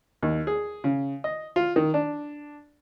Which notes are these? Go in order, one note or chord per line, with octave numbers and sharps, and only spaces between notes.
D#2
G#4
C#3
D#5
F4
D#3
D4